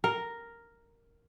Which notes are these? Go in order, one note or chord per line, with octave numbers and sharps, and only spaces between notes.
A#4